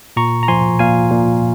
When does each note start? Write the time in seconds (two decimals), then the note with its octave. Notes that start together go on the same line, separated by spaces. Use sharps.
0.16 A#2 A#5 C#6
0.43 A#5
0.48 F3 G#5 C6
0.79 A#2 F5 G#5
1.11 A#2